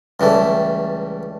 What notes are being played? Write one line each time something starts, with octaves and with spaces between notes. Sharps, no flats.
C#2 E3 G3 A3